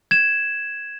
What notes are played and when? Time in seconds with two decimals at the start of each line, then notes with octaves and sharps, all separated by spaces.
0.11 G#6 E7